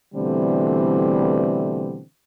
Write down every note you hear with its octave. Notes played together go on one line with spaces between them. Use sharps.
B2 D3 E3 G3 A3 C4